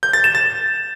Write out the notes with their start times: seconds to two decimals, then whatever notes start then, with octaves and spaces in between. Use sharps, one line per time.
0.03 G6
0.13 A6
0.24 E7
0.35 A6